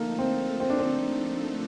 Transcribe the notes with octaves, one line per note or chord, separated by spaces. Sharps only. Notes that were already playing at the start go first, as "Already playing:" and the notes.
Already playing: D3 F3 A3 A#3 D#4 A4
C4
C4
D4
C4